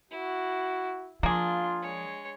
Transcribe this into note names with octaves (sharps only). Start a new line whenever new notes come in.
E4 F#4
F3 A#3 D4 F4 G#4 C6
G#3 C#5